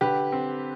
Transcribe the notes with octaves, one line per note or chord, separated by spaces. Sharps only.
D3 G4 B4
C4